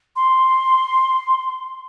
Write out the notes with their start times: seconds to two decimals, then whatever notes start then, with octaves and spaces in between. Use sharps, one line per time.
0.16 C6